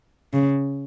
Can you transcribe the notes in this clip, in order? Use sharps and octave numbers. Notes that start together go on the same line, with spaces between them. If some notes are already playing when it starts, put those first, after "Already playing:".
C#3